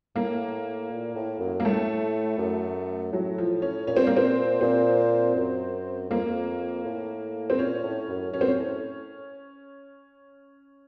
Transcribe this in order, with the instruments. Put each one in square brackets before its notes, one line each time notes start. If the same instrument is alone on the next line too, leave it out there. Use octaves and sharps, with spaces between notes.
[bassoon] A2 [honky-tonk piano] A#3
[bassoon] A#2
A2
F#2
[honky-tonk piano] A#3
[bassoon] A2 [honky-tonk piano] A3
[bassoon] F#2
[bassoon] A2 [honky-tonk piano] F#3
[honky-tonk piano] F3
C#4
[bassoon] A#2 [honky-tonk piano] C#4
[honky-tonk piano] C4
A#3
C4
[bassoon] A#2 [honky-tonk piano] C4
[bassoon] F#2
[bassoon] F2 [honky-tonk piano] A#3
[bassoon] F2
A2
[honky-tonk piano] C4
[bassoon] A#2 [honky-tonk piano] C#4
[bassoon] A2
F#2
[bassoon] F#2 [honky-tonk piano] C#4
[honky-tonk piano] C4
C#4
[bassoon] A2